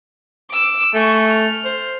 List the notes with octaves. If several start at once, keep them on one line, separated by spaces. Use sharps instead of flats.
D6 E6
A3 G#5 C#6
F6
C5